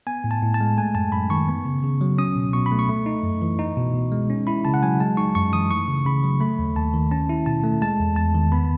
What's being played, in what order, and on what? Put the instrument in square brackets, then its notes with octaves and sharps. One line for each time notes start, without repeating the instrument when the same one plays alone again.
[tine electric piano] B3 G#5
A2
A5
A2
A5
G#3
A3 G#5
F#2 A5
F#2 B5
D#3 C#6
B3
C#3
C#3
F#3
C#4 D#6
B2
B2 C#6
B5
A3
C#6
A3
D#4
F#2
E3
D#4
B2
B2
G#3
C#4
E4 B5
C#3 A5
F#5
F#3 G#5
G#3 A5
D#4 C#6
F#2 C#6
E3 D#6
A3 C#6
C#3
C#3 B5
F#3
A3 B5
D#2
D#2 A5
D#3
C#4 A5
E4
B2 A5
A3
G#3 A5
E2
E2 A5
D#3
B3 B5